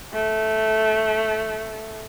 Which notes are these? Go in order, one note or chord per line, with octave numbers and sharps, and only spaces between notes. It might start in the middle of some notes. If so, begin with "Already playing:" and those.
A3